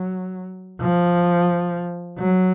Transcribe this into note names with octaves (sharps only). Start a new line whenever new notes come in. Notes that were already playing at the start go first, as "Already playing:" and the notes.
Already playing: F#3
F3
F#3